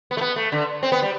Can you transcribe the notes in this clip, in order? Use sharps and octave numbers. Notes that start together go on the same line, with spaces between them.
B3
A3
B3
A3
D3
C4
B3
G3